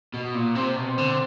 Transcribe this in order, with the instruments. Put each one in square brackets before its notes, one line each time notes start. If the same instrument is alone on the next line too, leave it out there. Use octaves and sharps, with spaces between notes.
[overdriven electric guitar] B2
A#2
[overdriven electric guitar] C3 [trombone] C4
[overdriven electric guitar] B2
[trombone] C4
[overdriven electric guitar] D3